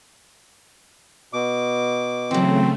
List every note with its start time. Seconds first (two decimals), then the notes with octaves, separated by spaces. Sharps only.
1.33 B2 D6
2.31 C#3 E3 F#3 A3 C4